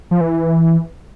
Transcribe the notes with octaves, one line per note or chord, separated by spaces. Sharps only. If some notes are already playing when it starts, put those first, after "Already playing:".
F3
E3